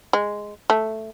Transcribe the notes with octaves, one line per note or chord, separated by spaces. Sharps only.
G#3
A3